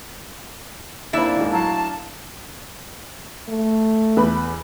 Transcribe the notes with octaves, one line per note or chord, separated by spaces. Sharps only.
D#2 A2 A#3 C4 D4 E4 E5
D#2 G#2
A2 F#3 F5 A5
A3
E2 B4 B5